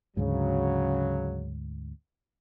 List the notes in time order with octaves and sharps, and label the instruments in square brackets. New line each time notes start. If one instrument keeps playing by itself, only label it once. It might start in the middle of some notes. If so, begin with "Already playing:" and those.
[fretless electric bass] D2 G#2 [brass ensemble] C#3 F#3